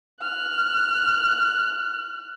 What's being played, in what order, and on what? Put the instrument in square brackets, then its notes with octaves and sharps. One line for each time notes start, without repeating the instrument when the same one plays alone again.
[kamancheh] F6 F#6